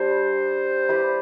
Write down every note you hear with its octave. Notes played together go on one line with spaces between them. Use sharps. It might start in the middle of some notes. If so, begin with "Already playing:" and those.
Already playing: G3 D4 G4 C5
E4 G4 B4 D5